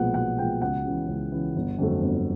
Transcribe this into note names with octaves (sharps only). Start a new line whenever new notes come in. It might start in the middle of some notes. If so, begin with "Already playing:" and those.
Already playing: B1 A#2 F3 G#3 B3 F#5
B1 F#5
A#2 F3 G#3 B3 G5
C#2 F#5
C#3 E3
C#2
C#3 E3
G1
F2 D3 F#3 A3
G1